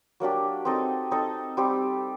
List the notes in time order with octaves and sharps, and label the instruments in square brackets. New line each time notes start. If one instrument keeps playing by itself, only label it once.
[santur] F#3 A#3 D4 G4
C4 D#4 A4 D#5
C4 D#4 A4 D#5
G3 C4 G4